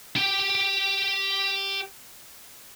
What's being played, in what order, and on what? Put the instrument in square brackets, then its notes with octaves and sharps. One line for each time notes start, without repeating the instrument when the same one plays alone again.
[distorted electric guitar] G4 G5